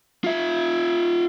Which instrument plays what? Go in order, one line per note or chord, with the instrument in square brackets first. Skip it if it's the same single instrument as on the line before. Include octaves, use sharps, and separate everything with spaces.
[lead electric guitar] F4 E5